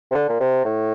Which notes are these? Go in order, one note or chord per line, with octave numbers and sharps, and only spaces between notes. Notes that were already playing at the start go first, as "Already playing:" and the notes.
C3
D3
A#2
C3
A2